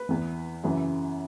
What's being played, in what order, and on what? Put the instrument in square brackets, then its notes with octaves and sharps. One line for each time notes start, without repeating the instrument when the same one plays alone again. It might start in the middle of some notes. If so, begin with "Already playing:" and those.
Already playing: [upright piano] B4
E2 E3
F#2 C#3 E3